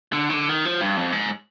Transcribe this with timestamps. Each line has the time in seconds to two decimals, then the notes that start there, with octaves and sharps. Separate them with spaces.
0.13 D3
0.29 D#3
0.33 D3
0.49 D#3
0.65 F3
0.81 G2
0.97 F2
1.12 G#2